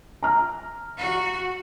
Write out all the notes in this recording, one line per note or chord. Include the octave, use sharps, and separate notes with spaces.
A#5 F6
F#4